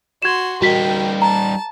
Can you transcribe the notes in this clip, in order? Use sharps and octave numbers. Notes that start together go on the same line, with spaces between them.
F#4 C6 G#6 E7
G3 D#4 F#4 A#4 G5 B6
A5 A#5